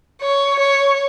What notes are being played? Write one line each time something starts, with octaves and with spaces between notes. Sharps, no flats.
C#5
C#5